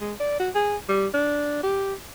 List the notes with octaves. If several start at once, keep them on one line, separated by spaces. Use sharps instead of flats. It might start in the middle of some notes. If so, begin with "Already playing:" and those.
G#3
D5
F#4
G#4
G3
D4
G4